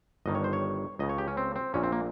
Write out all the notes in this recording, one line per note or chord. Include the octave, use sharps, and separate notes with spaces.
G1 G2 D#3 D#5
C#5
C5
C#5
C#2 C#3 D#5
C#5
G4
C#4
C4
C4
A#1 A#2 C#4
C4
A#3